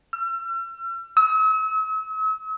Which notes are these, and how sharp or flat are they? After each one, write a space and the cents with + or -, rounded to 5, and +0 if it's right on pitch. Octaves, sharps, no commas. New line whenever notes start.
E6 +45
E6 -45